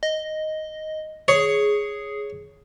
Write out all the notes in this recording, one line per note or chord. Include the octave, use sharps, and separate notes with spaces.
D#5
G#4 C#5